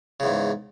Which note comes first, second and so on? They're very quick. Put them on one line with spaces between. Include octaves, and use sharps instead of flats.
C#3 E2 G#2